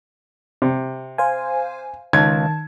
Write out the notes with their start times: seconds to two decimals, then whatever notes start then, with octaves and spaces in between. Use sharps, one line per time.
0.62 C3
1.18 C5 F5 G#5
2.13 C#2 D#3 A5 G#6